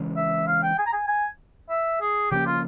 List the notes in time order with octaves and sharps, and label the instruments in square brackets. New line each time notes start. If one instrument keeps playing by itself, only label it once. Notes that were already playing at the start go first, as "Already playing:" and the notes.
Already playing: [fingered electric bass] C#3 E3 G#3 C#4
[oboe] E5
F5
G5
G#5
A#5
G#5
G#5
E5
G#4
[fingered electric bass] C#3 F3 A#3 C#4 [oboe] G4
[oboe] F4